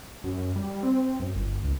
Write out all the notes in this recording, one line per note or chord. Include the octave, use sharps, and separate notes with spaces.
F#2
G3
C4
F#2
G1
C#2